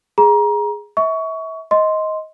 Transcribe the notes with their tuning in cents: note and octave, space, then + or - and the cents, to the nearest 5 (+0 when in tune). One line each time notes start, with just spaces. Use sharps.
G#4 +0 A#5 +25
E5 -30 C#6 +20
D#5 +15 C6 +0